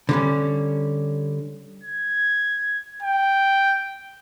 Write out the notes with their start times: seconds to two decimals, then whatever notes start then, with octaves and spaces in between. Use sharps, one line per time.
0.09 D3 G3 C#4
1.84 G#6
3.03 G5